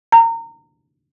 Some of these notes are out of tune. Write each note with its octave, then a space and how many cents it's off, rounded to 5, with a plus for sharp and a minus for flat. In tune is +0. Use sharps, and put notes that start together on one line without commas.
A#5 -25